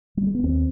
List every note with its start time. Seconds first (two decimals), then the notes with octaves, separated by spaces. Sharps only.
0.17 G3
0.27 G#3
0.35 B3
0.43 D#2 C4